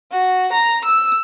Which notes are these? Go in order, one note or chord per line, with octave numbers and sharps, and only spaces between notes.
F#4
A#5
E6